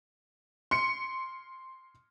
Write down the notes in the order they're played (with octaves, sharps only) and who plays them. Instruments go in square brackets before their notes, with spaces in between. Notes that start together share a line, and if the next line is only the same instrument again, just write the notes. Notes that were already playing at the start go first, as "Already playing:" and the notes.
[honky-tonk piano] C6 C#7